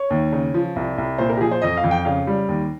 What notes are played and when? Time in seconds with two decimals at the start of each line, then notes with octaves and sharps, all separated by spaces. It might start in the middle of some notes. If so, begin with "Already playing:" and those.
Already playing: C#5
0.10 D#2
0.32 C#3
0.54 F3
0.76 C2
0.98 C2
1.18 A#2 C5
1.30 A#4
1.37 G4
1.41 F3 G#4
1.51 C5
1.62 F2 D#5
1.77 F5
1.84 F2
1.91 G5
2.05 C#3 F5
2.27 G3
2.49 D#2